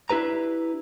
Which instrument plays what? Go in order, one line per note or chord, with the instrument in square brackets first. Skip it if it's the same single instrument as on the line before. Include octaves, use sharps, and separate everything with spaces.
[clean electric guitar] D4 E4 G4 B4 A#5